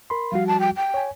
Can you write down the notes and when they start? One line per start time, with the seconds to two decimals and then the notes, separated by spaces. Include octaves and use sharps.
0.10 A#4 B5 C6
0.32 F3 G3 F#4 F5
0.47 A5
0.60 G5
0.77 G5
0.94 C#5 G#5